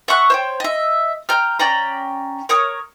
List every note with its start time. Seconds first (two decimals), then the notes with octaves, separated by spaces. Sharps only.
0.08 E5 F#5 C#6 F#6
0.30 C5 C#5 G5
0.60 D#5 E5
1.29 G5 A#5 F6
1.59 C#4 D5 G5 A#5
2.49 A#4 C#5 D#6